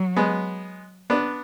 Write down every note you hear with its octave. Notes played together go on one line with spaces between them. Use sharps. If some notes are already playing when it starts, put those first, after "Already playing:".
Already playing: F#3
G#3 B3
B3 D4